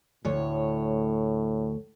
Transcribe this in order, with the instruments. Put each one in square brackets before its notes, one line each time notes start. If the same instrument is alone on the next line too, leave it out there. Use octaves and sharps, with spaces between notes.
[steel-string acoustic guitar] D2 C#5 [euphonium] A2